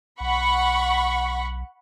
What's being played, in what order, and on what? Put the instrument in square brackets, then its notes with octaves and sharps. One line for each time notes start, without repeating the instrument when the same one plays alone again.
[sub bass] B1 [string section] F#5 B5 C#6